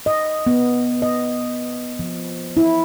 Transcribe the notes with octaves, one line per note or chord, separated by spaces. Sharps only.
D#5
B3
D#5
F3
E4